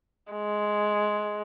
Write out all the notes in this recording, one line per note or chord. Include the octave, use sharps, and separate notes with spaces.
G#3